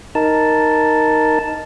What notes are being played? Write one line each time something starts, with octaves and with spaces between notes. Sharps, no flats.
D#4 A#4 A5